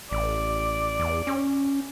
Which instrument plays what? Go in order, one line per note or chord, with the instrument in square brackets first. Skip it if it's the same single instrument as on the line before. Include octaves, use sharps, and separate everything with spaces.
[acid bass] A1 [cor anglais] D5
[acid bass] E2
C#4